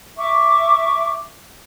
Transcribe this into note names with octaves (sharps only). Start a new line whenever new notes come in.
E5 C#6 D6